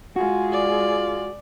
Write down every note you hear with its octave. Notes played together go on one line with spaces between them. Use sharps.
G#3 F4 F#4 G#4
D5